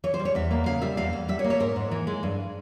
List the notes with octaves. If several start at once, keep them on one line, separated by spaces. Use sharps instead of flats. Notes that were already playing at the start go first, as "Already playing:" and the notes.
E3 C#5
C5
G3
C#5
E2 E5
A#3
C#3 F5
G3 E5
E2 F5
E2
G3 E5
C#5
A#3
C#5
G#2 A#4
G#2
E3
G#3
G2